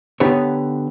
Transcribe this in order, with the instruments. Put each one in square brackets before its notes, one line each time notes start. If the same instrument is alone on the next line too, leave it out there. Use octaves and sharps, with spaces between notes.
[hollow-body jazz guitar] D3 B3 D#4 G4 C#5